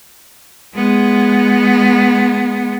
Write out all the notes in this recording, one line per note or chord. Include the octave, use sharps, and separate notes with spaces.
G#3 B3